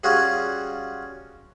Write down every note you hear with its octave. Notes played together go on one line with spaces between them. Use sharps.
G3 C#4 F4 F#4 G#4